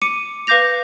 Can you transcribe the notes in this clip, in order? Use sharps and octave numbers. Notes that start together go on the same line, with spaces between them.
D6 C#7 D#7
B4 F5 D6 G6 A#6 F7